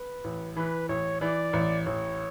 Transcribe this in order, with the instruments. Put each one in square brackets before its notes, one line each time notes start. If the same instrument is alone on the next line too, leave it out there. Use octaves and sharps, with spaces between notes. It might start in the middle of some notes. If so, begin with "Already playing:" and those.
Already playing: [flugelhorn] B4
[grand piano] A1
[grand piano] E3 [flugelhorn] B4
[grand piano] A1 [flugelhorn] C#5
[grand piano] E3 [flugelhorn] D5
[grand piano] A1
[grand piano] A1 [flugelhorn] C#5